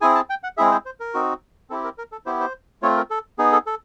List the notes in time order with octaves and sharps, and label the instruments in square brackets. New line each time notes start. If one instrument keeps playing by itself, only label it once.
[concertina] C4 E4 G#4 G#5
A5
G5
F#5
G#3 C4 E4 G#4 E5
C5
C5
A#4
C4 D#4 F#4
C4 E4 G4 A4
A#4
A#4
A4
B3 E4 G4 C5
C5
A3 C4 F4 C#5
A#4
A4
B3 D#4 G#4
A4
A4